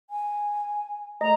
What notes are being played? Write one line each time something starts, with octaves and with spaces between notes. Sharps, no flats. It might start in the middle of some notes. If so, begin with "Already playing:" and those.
G#5
A3 D#5 A#5